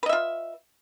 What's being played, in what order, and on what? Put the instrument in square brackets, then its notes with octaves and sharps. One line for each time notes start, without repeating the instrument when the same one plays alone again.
[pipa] B4
D#5
E5
F4